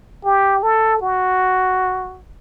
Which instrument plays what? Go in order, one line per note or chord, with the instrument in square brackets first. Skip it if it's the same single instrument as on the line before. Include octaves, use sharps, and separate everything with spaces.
[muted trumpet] G4
A4
F#4